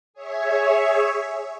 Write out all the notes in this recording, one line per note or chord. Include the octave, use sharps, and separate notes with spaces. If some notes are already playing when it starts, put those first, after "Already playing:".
G#4 C#5 E5